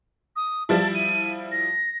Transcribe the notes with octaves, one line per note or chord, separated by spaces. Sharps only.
D#6
F3 G3 E4 A5
D#7
A#6